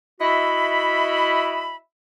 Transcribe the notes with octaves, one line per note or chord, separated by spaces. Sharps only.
E4 F#4 D#5 E5 B5